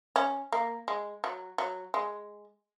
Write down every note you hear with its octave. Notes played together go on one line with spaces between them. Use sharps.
C#4
A#3
G#3
F#3
F#3
G#3